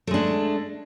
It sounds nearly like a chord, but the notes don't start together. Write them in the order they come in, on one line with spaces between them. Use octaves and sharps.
A3 G#3 D4